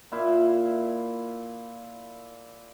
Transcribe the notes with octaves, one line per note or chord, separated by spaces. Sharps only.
A#2 E4 F5